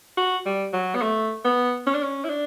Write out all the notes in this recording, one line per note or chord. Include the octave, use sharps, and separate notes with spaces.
F#4
G3
F#3
B3
A3
B3
C#4
D4
C#4
E4
D4